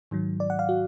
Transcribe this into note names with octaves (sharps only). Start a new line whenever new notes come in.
G#2 D#3 F#3
D5
F#5
F5
F#4